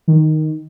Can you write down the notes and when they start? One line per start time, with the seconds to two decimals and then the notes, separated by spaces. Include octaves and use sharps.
0.07 D#3